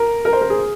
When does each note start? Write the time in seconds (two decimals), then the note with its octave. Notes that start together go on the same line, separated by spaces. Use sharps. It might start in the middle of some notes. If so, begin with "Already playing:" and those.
Already playing: A#4
0.25 A#4
0.33 C5
0.41 A#4
0.50 G#4